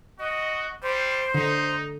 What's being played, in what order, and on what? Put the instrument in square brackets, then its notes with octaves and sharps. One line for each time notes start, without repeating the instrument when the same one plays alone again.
[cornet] F#4 [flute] D#5
[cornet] G3 [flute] C5
[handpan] D3 [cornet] D#4